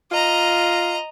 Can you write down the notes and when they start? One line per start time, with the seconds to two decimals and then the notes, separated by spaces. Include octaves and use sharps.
0.12 F4 D#5 A#5